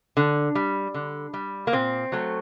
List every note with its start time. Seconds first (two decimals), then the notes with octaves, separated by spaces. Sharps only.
0.17 D3
0.55 G3
0.94 D3
1.34 G3
1.67 A#3
1.73 A#2 C4
2.12 F#3 A3